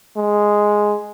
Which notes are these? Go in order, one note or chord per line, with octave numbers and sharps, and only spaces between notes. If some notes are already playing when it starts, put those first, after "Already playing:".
G#3